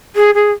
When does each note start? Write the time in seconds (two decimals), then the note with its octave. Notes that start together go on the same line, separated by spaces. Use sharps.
0.16 G#4
0.35 G#4